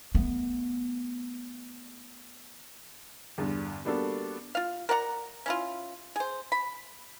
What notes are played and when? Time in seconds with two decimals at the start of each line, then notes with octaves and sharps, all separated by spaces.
0.15 A3 B3
3.38 E2 G2 D3
3.85 G3 A#3 B3 D4 F#4 A4
4.55 F4 F5
4.89 A#4 D5 F#5 A#5
5.46 C#4 E4 F4
6.16 G#4 C5
6.52 B5